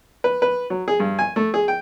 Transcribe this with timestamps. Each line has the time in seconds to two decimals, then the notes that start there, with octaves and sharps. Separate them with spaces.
0.24 B4
0.42 B4
0.70 F#3
0.88 G#4
1.00 G2
1.19 G#5
1.36 A3
1.54 G#4
1.68 G5